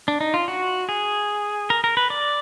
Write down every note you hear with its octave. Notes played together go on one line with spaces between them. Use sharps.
D4
D#4
F4
F#4
G#4
A#4
A#4
B4
D5